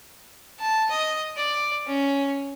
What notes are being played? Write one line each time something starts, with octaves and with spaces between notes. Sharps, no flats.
A5
D#5
D5
C#4